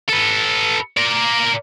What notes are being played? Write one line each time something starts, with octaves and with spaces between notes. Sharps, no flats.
A4 B4
A#4 D5